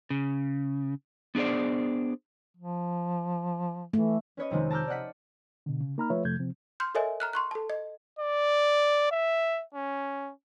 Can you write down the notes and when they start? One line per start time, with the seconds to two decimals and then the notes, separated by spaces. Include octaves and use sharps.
0.10 C#3
1.35 B3 D4 G#4 C5 D5
2.57 F3
3.93 E3 A3
4.37 C#4 B4 C#5 D#5
4.50 F2 C3 D#3 G#3 C4
4.70 A5 A#5 D6 E6 F6 G6
4.88 D5 D#5 F#5 B6
5.66 B2 D3
5.80 C#3
5.98 A#3 D#4 A#5 B5 F6
6.10 F3 A3 F4 B4 C#5 E5
6.24 F2 C3 F3 A3 G6 G#6
6.39 C3 F3 C4
6.80 C6 F6 G6
6.95 A4 A#4 C#5 D#5 E5 G#5
7.20 A#5 F6 F#6
7.33 C6 C#6 F#6
7.51 A4 A5
7.70 D#5
8.19 D5
9.12 E5
9.74 C#4